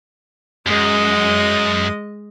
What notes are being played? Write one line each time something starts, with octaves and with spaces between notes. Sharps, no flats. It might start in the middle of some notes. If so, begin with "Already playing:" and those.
F#2 G#3 D#5